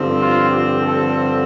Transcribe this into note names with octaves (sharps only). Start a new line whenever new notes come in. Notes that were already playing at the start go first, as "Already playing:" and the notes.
Already playing: G2 D3 F3 C4
F4
G4
A4